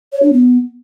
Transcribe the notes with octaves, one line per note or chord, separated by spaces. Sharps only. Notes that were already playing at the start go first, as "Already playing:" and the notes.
C#5
D4
B3